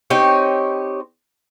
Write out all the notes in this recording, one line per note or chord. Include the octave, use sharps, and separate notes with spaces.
C4 D#4 G4 C#5